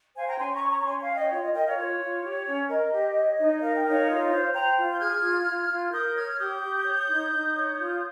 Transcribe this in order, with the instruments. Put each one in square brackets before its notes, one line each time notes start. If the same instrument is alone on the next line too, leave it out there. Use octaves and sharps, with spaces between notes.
[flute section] C5 F5 G#5
G5 A#5
C#4 G#5 C6
A#5 C#6
C#5
A#5 C#6
A#5
C#4 G#5 C6
F5 G#5
C#5
D#5 G5
F4 C#5 F5
D#5
A#4 D#5 G5
C#5 F5
F4 C#5
F4
G4
C#4
A#4 D#5
G4
C#5
D#4
A#4 F5
G5
D#4 C#5 F5
F4
C5
C5 G5 A#5
F4
G6
G#4 F6 G#6
F4
F4
F4
A#4 D#6 G6
C#5 F6 G#6
G4 D#6 G6
G4
C#5
D#4
D#4
C#5
F4